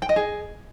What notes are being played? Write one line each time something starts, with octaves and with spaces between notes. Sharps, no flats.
G5
D#5
G#4